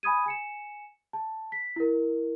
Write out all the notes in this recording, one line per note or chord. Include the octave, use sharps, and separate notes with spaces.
G#5 B5 D#6 G#6 D#7
G#5 C#7 E7
A5
B6
E4 A#4